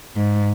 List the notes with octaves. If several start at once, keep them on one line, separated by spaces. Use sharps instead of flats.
G#2